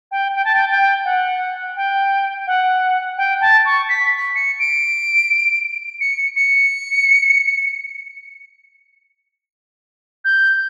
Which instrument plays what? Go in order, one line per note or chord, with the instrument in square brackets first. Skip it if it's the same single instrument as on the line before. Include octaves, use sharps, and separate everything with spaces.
[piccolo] G5
G5
A5
G5
G5
F#5
G5
F#5
G5
A5
C#6
B6
C#7
D7
C#7
C#7
G6